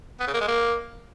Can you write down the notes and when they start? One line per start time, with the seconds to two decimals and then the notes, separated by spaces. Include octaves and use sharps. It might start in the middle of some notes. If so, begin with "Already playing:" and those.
0.20 B3
0.27 C#3
0.34 A#3
0.41 G#3
0.47 A#3